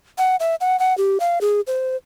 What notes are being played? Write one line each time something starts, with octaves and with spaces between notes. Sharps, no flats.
F#5
E5
F#5
F#5
G4
F5
G#4
C5